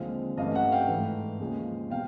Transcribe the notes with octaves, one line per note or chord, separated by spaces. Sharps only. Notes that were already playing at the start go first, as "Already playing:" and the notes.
Already playing: D#2 D3 F3 G#3 C4 F5
G2 E3 A3 C#4 D#5 F5
E5 F#5
F5 G5
G#2 E3 A3
D#2 C#3 F3 G#3 C#4
B2 F5 G5